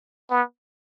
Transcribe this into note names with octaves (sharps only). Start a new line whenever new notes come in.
B3